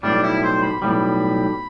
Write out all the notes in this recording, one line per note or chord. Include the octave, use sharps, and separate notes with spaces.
B1 A2 G3 D4
E4
C5
B5
B1 A2 G3 B5